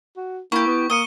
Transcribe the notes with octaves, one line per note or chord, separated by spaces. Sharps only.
F#4
A#3 E4 G4 C#6
B3
A#3 D#6 C#7 D#7 G7